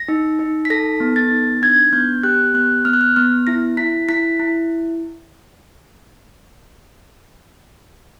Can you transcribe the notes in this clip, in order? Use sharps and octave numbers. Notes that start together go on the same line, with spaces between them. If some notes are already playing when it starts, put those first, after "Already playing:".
Already playing: A#6
D#4
D#4
B6
A4 A#6
B3
A6
D#4
D4 G#6
B3 G6
G4 F#6
B3 F#6
B3 F6
F#6
F6
B3 F6
E4 A#6
E4 B6
E4 B6
E4